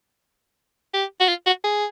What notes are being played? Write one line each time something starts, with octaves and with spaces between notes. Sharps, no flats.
G4
F#4
F4
F#4
G#4